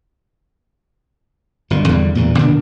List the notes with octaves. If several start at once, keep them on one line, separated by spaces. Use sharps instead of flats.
G1 B2 D3
E2 D3 G3
E2 G2 A#2
A#2 D3 D#3 D4